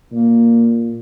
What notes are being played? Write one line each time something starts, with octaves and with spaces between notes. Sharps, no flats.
A#2 A#3